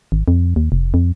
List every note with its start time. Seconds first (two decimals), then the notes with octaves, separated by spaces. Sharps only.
0.12 G#1
0.28 F2
0.56 D#2
0.72 F1
0.94 F2